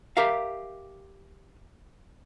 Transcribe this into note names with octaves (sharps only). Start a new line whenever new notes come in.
G4 A#4 E5 F5